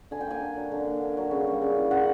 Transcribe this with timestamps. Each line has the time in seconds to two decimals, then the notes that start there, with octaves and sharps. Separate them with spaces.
0.11 D3 G#5
0.21 G5
0.27 A#3 G#5
0.41 D3
0.56 F#3
0.72 D3
0.86 A#3
1.01 D3
1.17 F#3
1.31 C#3
1.47 G3
1.62 C#3
1.76 E3
1.91 C#3 F#5